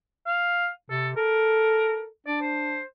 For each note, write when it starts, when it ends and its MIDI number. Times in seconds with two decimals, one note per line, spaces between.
0.26 0.69 77
0.90 1.14 48
0.90 1.08 69
1.16 2.06 69
1.16 2.06 70
2.26 2.81 62
2.26 2.40 74
2.42 2.82 72